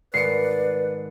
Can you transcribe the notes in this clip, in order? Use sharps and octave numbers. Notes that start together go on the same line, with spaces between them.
G#1 B4 D5 C7 C#7